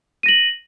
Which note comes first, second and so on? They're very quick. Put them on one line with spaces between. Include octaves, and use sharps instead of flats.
D#7 A#6 F#7